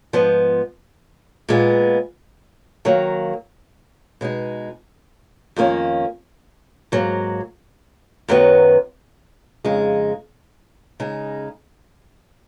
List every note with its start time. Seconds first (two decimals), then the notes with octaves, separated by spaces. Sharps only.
0.13 G#2 F3 B3
1.49 A#2 G#3 B3
2.85 D#3 F#3 A#3
4.21 B2 G#3 D#4
5.56 F2 D#3 A#3 C#4
6.92 G#2 F#3 A#3
8.28 F#2 D#3 F#3 B3
9.65 F2 C#3 G#3 D#4
11.00 C#3 G#3 D#4